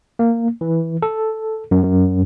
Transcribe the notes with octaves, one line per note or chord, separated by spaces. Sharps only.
A#3
E3
A4
F#2
F#2